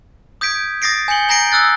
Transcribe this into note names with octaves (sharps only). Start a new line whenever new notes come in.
D#6 G6 G#6 B6 D7
D#6 A6 A#6 C7 D7
G#5 G6 C#7 F#7 G7
G#5 A#5 G6 A#6 C7 D7
D#6 E6 F#6 A6